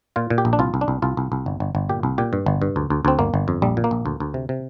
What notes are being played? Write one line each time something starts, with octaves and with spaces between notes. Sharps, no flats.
A#2 F4
A#2
G4
A#1
D4
C2 F4
C2
D4
C2
C2 F4
C2
C2
G1
G1
G1
A#2 G4
C2
A#2 G4
G2
G1
G2
D2
D2
D2 C4
G1 A#3
G1
F2
A#1 G3
A#2
A#3
A#1
D2
D2
C3
C3